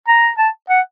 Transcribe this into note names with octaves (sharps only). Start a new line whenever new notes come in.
A#5
A5
F#5